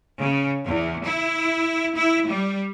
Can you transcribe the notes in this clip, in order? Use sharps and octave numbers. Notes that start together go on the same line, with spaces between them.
C#3
E2
E4
E4
G3